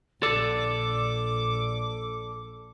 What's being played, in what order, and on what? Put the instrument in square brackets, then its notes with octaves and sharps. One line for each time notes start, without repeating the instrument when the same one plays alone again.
[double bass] A#1 [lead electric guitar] A4 D5 [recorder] D6